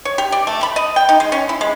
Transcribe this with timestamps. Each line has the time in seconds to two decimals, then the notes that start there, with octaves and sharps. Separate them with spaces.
0.05 C#5
0.18 G4
0.32 D5
0.47 A3
0.63 B5
0.76 D#5
0.96 G5
1.09 D#4
1.20 G#3
1.32 C#4
1.49 E4
1.61 G#3